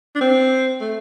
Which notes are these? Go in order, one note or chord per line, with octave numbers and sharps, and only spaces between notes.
D4
C4
A3